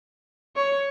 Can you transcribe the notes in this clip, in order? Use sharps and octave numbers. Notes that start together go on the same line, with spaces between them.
C#5